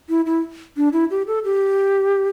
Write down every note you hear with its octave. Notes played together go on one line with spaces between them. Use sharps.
E4
E4
D4
E4
G4
A4
G4